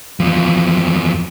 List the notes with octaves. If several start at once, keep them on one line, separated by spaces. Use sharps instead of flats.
E2 F3